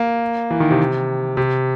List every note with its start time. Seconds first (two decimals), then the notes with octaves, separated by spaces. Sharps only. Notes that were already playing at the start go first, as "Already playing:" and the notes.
Already playing: A#3
0.51 E3
0.60 D#3
0.71 C3
1.37 C3